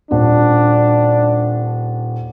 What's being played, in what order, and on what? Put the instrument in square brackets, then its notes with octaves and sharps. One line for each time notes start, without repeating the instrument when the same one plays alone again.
[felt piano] D#1 [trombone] D4